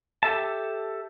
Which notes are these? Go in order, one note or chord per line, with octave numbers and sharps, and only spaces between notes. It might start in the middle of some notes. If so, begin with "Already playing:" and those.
G4 A4 E5 A5